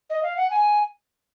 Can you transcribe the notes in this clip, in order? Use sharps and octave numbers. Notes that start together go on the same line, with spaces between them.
D#5
F5
F#5
G#5